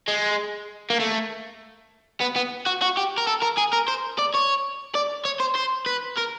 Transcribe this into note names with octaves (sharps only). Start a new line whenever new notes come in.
G#3
A#3
A3
B3
B3
F#4
F#4
G4
A#4
A4
A#4
G#4
A#4
C5
D5
C#5
D5
C#5
C5
C5
B4
A#4